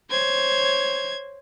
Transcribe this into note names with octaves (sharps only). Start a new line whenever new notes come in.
C5 C#5 G#6